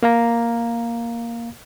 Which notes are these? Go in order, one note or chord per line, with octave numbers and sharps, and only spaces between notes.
A#3 F5 A#5